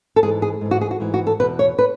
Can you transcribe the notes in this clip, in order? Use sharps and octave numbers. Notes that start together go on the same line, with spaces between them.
A4
G#2 E3 G#4
G#4
G#2 E3
F#4
G#4
F#4
G#2 E3
F#4
A4
E2 B2 B4
C#5
B4